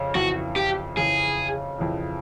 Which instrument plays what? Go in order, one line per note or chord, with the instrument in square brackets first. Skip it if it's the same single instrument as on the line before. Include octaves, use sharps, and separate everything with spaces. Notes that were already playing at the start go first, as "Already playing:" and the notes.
Already playing: [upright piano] F2 C#3
[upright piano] F2 C#3 E3 [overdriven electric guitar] F#4
[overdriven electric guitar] G4
[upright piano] F2 C#3 E3 [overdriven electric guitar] G#4
[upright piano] F2 C#3 E3